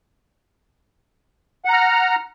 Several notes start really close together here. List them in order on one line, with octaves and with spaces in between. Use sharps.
F#5 A#5 F6